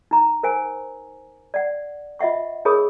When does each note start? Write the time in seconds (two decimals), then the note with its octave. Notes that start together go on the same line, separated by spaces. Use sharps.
0.11 D#4 A#5
0.43 A#4 C5 G#5
1.54 D5 F#5
2.19 F4 D#5 E5 F#5 C#6
2.65 D#4 G#4 A#4 C#5 B5 D#6